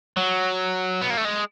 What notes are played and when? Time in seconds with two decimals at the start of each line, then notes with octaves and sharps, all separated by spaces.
0.17 F#3
1.02 B3
1.10 A#3
1.18 A3
1.25 G#3